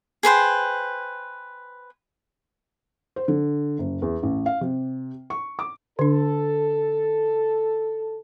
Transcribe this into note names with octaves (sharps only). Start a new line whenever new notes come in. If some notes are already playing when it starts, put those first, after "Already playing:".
G#4 B4 C5 G5
C5
D3
F#1
E2
A1
F5
C3
C#6
D6
D3 D4 A4